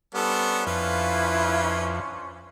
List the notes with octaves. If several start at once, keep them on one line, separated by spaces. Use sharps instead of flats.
G3 B3 C#4 D4 A4 C5
F2 E4 F4 B4